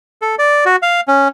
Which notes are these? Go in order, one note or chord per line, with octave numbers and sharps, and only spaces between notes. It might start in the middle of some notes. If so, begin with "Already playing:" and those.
A4
D5
F#4
F5
C#4